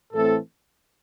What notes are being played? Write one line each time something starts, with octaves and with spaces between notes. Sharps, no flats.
A2 E3 A3 C4 A4